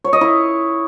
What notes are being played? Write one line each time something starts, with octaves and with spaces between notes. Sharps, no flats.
C#5
D#5
E4